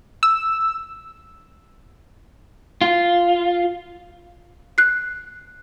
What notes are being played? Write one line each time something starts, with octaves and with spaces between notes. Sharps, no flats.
E6
F4
F#6 C7